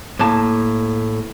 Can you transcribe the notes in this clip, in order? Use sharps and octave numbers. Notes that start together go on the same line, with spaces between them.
A2 A#3 A5